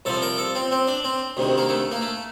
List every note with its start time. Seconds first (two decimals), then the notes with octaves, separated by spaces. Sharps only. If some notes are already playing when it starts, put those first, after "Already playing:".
0.05 C2 C3 F3 A4
0.22 A#4
0.38 A4
0.55 C4
0.71 C4
0.87 D4
1.04 C4
1.37 D2 C3 D#3
1.58 A#3
1.69 A3
1.92 A#3
2.01 A3